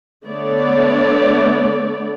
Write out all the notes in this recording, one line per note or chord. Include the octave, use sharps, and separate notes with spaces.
D3 A3 B3 C#5 D5